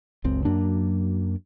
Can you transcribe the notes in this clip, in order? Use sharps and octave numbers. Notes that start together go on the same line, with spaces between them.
F#1 C#2 C4
F#2 F#3 A#3 D4